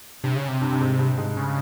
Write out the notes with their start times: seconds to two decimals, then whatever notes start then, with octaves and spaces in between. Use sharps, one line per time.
0.23 G2 C3
0.36 C#3
0.48 C3
0.61 G2
0.72 G2
0.80 G#2
0.99 G2
1.17 G#2
1.37 C#3